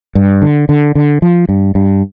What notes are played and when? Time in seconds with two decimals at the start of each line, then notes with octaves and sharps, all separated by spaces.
0.15 G2
0.42 D3
0.69 D3
0.95 D3
1.22 F3
1.49 G2
1.75 G2